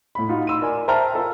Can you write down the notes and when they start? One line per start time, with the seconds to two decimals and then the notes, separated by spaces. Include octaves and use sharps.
0.15 A2 B5
0.29 D#4 F4 F#4
0.47 C6 E6 D#7
0.62 A#4 D5 G#5
0.88 C5 E5 G5 A5 A#5 F6
1.14 F4 A4 A#4